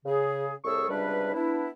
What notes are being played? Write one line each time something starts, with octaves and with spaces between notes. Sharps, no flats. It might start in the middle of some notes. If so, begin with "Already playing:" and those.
C#3 G#4
C2 A2 G#4 A4 C#6 E6
C#2 C3 G3 D4 B4
B3 D4 E4